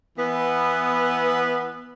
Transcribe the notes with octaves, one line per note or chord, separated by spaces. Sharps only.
E3 B3